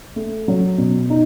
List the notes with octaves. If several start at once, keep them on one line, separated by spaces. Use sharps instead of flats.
A3
F#3
B2
D#4